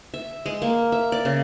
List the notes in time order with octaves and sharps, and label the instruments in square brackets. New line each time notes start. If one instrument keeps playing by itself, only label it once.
[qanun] E5
G#3
A#3
E5
D5
C#3